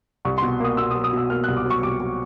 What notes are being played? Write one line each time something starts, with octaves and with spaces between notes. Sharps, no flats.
C2 C#6
B2 C6
A#3 D#6
B2 E6
D#6
F#3
D#6
B2 E6
A#3 F6
C2 F#6
D6
F#3 C#6
C2 D6
F#3